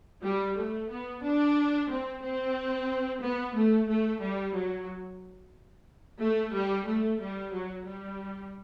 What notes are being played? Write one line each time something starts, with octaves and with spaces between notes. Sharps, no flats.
G3
A3
B3
D4
C4
C4
B3
A3
A3
G3
F#3
A3
G3
A3
G3
F#3
G3